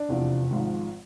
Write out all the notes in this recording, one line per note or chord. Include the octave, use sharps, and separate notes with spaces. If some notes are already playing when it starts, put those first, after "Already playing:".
Already playing: D4 D5
F1 E2 C3 F3
G#1 G#2 F3